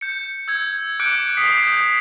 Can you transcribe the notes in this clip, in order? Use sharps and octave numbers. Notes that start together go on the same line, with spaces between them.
G6 C#7
E6 G#6
D6 F#6 G6 C#7 D7
D#6 B6 C7
G6